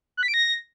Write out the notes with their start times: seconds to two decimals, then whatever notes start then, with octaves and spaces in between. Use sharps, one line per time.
0.17 F#6
0.23 B6
0.28 D7
0.34 A#6